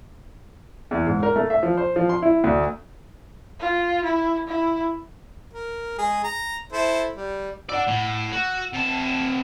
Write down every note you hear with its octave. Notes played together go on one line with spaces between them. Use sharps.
E2
G#2
A#4
A3
E5
F3
C5
F3
C6
E4
D2
F4
E4
E4
A#4
G#3 G#4
A#5
E4 A4 C5
G3
D4 D5 F#5 E6
A2
F#4
C3 A5